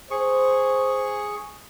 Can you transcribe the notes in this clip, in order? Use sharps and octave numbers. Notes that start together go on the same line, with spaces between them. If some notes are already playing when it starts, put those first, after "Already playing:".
G#4 C5 C#6